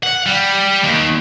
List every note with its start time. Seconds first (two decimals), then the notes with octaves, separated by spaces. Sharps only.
0.03 F#5
0.26 G3
0.84 D#2